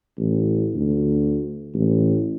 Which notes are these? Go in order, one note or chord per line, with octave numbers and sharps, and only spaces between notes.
A1
D2
A1